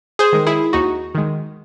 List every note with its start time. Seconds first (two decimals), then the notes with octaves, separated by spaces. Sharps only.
0.19 G#4 C5
0.33 D#3 G#3
0.47 E4 G#4
0.73 D#2 D#4 F#4
1.15 D#3 G#3